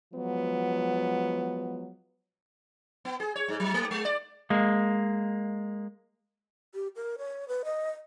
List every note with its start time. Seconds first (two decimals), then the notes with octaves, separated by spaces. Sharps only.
0.13 F3 F#3 G#3 B3
3.05 B3
3.20 G#4
3.36 C#5
3.48 G#2
3.60 F#3
3.74 A3
3.91 G#3
4.05 D5
4.50 G#3 A#3
6.74 G4
6.96 A#4
7.18 C#5
7.48 B4
7.65 D#5